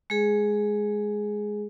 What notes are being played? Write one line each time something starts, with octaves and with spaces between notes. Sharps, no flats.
G#3 G#4